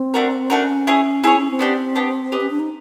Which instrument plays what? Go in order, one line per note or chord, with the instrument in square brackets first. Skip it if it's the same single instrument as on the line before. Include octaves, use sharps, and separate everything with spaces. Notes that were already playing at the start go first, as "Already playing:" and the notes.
Already playing: [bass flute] C4
[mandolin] A3 D4 F#4 A#4
[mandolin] A3 D4 F#4 A#4 [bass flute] C#4
[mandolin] E4 G#4 C#5
[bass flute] C4 [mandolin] E4 G#4 C#5
[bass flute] C#4
C4
[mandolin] B3 D4 G4
B3 D4 G4
G4 B4 D#5
[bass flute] C#4
D4
D#4